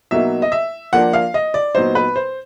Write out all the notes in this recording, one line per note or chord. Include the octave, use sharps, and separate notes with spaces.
B2 F#3 A#3 D#4 E5
D#5
E5
F3 A#3 D4 F#5
F5
D#5
D5
A#2 F#3 B3 D#4 C5
B4
C5